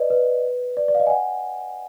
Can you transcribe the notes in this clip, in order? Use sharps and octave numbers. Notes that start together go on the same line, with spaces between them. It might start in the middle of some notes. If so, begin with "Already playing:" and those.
Already playing: B4 D5 D#5
B4
D5
D5
F5
D#5
G#5
F#5